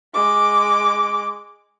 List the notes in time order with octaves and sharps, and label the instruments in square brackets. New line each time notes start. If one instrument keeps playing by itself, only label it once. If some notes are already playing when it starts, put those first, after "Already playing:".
[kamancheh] G#3 D6